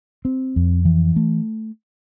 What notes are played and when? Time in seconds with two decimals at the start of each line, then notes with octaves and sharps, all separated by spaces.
0.25 C4
0.56 F2
0.85 E3
1.16 A3